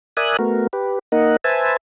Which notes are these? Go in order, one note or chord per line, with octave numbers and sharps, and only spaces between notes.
A#4 D5 E5 G#5 D#6 F#6
A3 B3 F#4 A#4
G4 B4
A#3 D#4 A#4 D#5 F#5
B4 C5 E5 G#5 A5